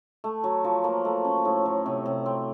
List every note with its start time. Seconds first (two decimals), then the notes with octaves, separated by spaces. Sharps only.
0.24 A3
0.44 F#3
0.64 F3
0.84 A#3
1.05 A3
1.25 C#4
1.45 A2
1.65 F#3
1.86 C3
2.06 C3
2.26 C4